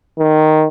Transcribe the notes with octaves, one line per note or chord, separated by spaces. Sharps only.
D#3